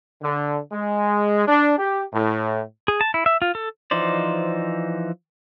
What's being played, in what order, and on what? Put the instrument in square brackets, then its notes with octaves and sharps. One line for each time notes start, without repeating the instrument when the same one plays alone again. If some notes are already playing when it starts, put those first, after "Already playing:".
[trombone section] D3
G#3
D4
G4
A2
[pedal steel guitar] G#4
A5
E4
E5
F4
A4
E3 F3 D#4 C5 D5